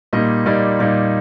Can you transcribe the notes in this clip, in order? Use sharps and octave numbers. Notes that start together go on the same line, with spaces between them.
A#2 G3 A#3 D#4 D#5
A#2 G3 A#3 D#4 D5
A#2 G3 A#3 D#4